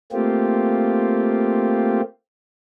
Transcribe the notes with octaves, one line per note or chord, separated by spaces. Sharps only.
A3 A#3 C4 F4 G4